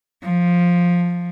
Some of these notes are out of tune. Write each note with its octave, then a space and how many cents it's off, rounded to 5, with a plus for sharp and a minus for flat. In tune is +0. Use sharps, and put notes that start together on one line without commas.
F3 +5